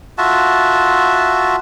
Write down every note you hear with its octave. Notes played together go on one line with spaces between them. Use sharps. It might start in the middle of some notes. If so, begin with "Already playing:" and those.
F4 F#4 E5 A5